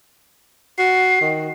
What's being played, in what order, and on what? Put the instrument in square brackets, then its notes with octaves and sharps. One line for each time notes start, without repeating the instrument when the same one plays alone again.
[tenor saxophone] F#4 [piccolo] C7
[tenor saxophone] D#3